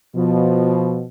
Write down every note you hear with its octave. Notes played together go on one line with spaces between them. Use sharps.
B2 F3